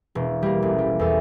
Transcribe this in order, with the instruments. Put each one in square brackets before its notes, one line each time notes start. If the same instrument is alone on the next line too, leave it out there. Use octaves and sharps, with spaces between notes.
[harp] E1
G3 A#3
A1
G3
E2 A4